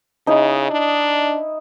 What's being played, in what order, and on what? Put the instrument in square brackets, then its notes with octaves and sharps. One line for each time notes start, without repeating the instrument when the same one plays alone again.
[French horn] C#3 [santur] D#4 E4
[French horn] D4